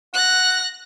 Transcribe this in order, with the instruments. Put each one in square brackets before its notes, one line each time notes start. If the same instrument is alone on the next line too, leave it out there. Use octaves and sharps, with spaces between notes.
[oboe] F#5 [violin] F#6 A#6